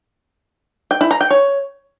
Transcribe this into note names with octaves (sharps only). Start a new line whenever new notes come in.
G5
E4
A#5
G5
C#5